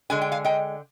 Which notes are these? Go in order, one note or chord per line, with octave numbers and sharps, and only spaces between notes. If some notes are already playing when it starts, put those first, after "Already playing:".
D3 G#3 G#5
G5
F5 G#5
D#5 G5